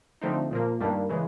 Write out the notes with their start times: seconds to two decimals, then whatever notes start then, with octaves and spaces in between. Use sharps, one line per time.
0.21 D3 F3 A3 C4 D#4
0.51 A#2 F3 A#3
0.80 G2 D#3 G3 A#3 D4
1.09 C#3 E3 G#3